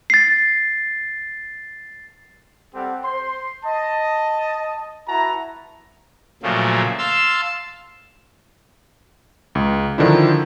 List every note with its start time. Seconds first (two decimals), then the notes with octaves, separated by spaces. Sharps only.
0.10 A6 C7
2.75 G3 C4 G4 A4 F#5
3.04 C5 C6
3.65 D#5 A5
5.08 E4 F#4 B4 A5 A#5
6.43 A#2 C#3 F3 F#3 A3
6.98 F5 A5 C6 E6
9.55 C#2
9.98 D3 D#3 F3 D4 E4